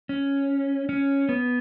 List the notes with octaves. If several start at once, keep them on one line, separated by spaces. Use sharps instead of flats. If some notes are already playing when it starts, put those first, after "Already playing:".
C#4
C#4
B3